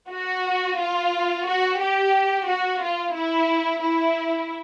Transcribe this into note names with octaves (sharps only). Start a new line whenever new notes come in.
F#4
F4
F#4
G4
F#4
F4
E4
E4